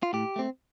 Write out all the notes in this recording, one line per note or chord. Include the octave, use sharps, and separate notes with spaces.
F4
A2 G4
A3 C4